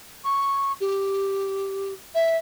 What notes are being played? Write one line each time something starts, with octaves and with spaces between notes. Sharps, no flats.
C#6
G4
E5